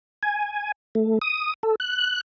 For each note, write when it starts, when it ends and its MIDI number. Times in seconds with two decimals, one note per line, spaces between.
0.23 0.72 80
0.95 1.19 57
1.22 1.54 87
1.63 1.75 69
1.80 2.21 90